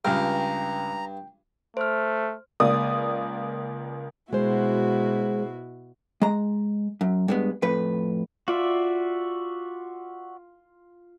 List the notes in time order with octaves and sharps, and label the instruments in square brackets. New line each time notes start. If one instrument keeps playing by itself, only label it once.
[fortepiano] C#2 F6 [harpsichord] G2 [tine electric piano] G5 [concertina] A#5
[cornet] A3 [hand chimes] C5 F6
[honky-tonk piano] C#2 A#3 D5 D#6
[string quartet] B2 E4 F#4 [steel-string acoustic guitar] G#3 C5
[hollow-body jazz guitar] G#3 A#5
F#2
G2 G#3 B3
F2 A2 B4
[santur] F4 [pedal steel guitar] F#4 D5 E5